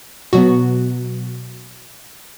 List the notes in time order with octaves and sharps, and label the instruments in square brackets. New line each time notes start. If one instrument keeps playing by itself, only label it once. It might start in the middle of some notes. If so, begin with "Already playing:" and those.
[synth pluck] B2 F#3 B3 F#4